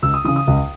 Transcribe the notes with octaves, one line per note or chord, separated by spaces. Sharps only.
C#2 E6
D#6
C#3 E3 D#6
D#6
C#2